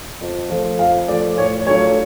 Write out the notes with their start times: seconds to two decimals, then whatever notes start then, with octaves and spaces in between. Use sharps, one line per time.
0.21 F2
0.50 F3 A3
0.79 F2 F5
1.08 F3 A3 D5
1.38 A2 C#5
1.67 F#3 A3 D4 F4 C#5